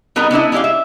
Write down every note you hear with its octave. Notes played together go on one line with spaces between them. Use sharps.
G3 B3 D#4 A#4 D#5 A#5
B3 D4 E4 D#5
G#3 E4 G4 D5 F5
E5